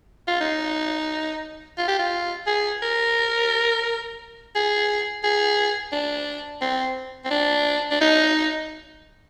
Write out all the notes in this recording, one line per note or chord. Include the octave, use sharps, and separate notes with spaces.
F4
D#4
F4
G4
F4
G#4
A#4
G#4
G#4
D4
C4
C4
D4
D4
D#4